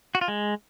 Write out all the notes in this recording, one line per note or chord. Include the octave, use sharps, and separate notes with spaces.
F#4
F4
G#3